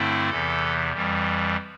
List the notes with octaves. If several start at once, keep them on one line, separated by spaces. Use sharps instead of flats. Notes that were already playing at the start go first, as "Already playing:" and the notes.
Already playing: G2 D3 A3 C4 E4
E2 C3 E3 A4
F2 E3 G3